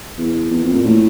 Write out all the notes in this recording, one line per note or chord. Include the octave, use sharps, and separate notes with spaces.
E2
E2
F2
A#2
A2